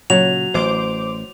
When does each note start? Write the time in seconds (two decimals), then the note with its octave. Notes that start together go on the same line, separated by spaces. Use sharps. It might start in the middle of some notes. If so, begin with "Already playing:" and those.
0.10 A#2 C#3 F#3 F7
0.54 A1 C5 D6